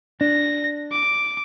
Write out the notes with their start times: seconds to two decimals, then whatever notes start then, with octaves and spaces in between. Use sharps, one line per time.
0.21 D4 A#6
0.92 D6